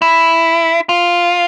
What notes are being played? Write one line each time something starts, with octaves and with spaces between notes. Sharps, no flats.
E4
F4